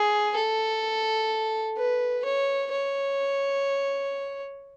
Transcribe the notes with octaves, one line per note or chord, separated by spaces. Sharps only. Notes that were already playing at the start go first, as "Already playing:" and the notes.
Already playing: G#4
A4
B4
C#5
C#5